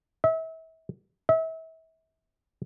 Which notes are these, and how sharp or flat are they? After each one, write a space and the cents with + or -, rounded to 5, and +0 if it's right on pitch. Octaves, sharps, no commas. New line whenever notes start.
E5 -35
E5 -35